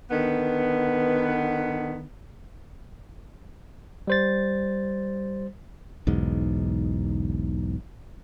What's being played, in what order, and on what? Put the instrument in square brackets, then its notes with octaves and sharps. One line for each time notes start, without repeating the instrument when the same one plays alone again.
[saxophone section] D3 D#3 B3
[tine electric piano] G3 C5 A6
[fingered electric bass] B1 E2 G#2